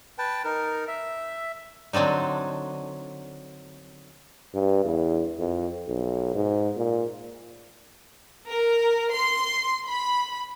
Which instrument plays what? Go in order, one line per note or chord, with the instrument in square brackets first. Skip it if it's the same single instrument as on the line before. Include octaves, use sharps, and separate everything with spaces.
[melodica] B4 G5 A5
D#4 A#4
E5
[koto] D3 F#3 C4 D4 D#4
[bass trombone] G2
E2
F2
B1
G#2
A#2
[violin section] A#4
C6
B5